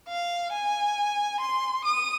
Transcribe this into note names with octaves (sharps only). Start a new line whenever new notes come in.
F5
G#5
C6
D#6